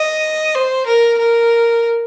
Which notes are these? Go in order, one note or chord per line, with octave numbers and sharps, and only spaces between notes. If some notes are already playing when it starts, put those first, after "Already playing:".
Already playing: D#5
C5
A#4
A#4